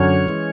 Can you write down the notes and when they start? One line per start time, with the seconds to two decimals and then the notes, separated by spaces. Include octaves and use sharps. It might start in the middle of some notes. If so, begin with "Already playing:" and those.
Already playing: F#2 D3 F#3 C#4 C#5
0.28 E3 G#3